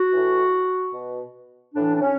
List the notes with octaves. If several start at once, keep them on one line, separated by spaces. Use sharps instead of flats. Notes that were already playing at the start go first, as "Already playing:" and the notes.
Already playing: F#4
A2 E3
B2
A2 E3 D4
D4
C#4